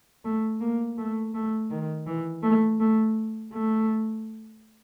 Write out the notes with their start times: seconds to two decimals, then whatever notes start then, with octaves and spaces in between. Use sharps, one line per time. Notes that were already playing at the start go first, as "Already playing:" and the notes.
0.25 A3
0.60 A#3
0.98 A3
1.34 A3
1.70 D#3
2.07 E3
2.43 A3
2.80 A3
3.53 A3